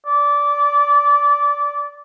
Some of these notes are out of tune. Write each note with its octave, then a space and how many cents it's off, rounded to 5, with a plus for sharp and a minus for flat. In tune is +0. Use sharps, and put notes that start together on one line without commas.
D5 -20